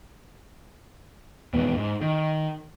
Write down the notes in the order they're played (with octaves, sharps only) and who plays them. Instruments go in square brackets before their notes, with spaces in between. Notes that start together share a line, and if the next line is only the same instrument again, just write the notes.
[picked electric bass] D#1 E2 G#2 B3
G#2
D#3